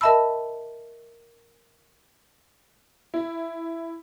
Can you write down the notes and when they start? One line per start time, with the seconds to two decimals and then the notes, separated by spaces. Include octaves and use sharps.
0.01 A#4 D#5 E5 A5 B5 E6
3.14 E4